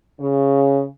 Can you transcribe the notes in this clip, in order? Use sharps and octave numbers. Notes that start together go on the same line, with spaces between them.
C#3